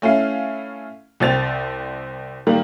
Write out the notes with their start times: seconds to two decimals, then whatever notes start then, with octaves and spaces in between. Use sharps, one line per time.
0.02 A3 C#4 E4 F5
1.20 C2 C4 A6 F7
2.47 D#3 G3 A#3